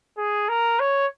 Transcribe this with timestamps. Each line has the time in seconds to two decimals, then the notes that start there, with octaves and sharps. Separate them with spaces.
0.18 G#4
0.49 A#4
0.80 C#5